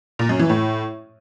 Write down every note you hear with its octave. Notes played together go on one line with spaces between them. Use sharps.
A#2
F#2
E3
A2